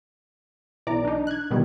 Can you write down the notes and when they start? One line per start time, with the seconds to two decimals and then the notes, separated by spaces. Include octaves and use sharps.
0.87 B1 E3 D5 A#5 D6
1.05 D4 D#4
1.27 F#6 G#6
1.51 B2 D#3 E3 G3